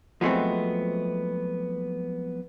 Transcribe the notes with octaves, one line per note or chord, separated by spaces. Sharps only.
F3 F#3 G#3 A3 B3 C4